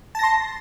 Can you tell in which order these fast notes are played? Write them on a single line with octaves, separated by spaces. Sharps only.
A5 A#6 C6